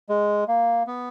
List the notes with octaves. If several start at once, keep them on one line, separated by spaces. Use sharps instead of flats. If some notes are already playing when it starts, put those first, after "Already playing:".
G#3
A#3
B3